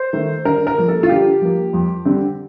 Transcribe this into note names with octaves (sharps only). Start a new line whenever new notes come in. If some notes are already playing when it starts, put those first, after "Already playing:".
Already playing: C5
D#3 A3
D3 A#4
A#4
F3 A#3
A4
F4
D3 G4
F3 A#3
F2
D3 G3 C4